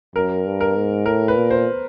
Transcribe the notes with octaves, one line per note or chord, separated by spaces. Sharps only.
F#2 A#4
G2
A#4
G#2
A2 A#4
B4
A#2
C5